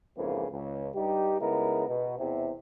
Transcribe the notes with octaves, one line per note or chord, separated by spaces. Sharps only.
F2 G#2 C#3 E3 A#3 B3
C#2
G2 G3 D#4 G4
C#3 G#3 B3 D#4 E4 A#4
B2
E2 C3